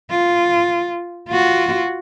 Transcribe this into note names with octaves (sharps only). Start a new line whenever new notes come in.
F4
F4 F#4